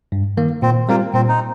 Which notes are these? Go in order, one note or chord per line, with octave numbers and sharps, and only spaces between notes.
G2
D#3 A#3
A#2 C4
G3 A#3 C4 F4
A#2 C4
D#4